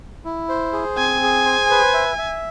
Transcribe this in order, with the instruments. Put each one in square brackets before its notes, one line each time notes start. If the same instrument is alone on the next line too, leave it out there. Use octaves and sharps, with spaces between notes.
[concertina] E4
C5
G#4
[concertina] C4 [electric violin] G#5
[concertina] G#4
C5
B4
E5
E5